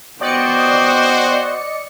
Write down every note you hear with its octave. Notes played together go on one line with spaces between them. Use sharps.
B3 F#4 C5 D5 D#5 G5 C#7